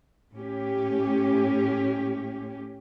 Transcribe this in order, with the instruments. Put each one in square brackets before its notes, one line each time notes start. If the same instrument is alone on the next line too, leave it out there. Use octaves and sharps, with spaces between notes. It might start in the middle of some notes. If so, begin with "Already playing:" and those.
[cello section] A2 C#4 G4